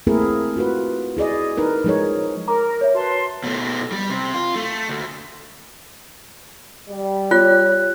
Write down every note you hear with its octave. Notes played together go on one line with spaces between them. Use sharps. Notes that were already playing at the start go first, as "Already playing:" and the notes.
A3 A#3 C4 E4 G#4 A#4
F4 F#4 B4
E4 G#4 D5 D#5
D#4 A#4 B4
F3 G#3 D#4 G#4 A#4 C#5
A#4 A#5 D6
C#5 E5
F#4 B4 A5 C6
B2 A3
G3
C3
F4
A3
D2
G3
F4 C#5 F#6